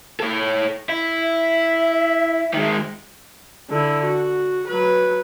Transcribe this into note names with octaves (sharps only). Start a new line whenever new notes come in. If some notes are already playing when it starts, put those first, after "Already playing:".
A4 C#5
E4
E5
D#3 G#3
D3 E4
F#4
F#3 B4